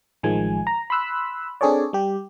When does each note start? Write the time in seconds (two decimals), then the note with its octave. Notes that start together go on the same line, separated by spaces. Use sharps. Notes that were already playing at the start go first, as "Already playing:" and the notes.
0.23 A1 D#3 F3 G#3 G#5
0.67 A#5
0.90 B5 C6 E6 F#6
1.61 C4 D4 G#4 A4 C#5 D5
1.93 G3 G4